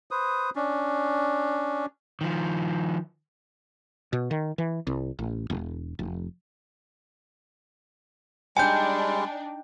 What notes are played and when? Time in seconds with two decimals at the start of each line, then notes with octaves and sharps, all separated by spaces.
0.11 B4 C5 D#6
0.56 C#4 D4
2.21 D#3 F3
4.13 B2
4.31 D#3
4.58 E3
4.87 C2
5.19 A1
5.50 E1
5.99 F1
8.57 G3 G#3 D4 D#4 G5 G#5 G6